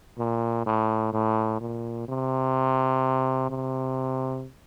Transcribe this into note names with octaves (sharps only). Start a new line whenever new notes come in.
A#2
A2
A2
A#2
C3
C3